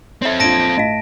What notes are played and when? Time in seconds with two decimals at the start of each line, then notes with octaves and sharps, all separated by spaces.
0.22 C4 A4 C#5 E5
0.40 A#1 F4 A5 A#6 D7
0.77 A2 D#5 F5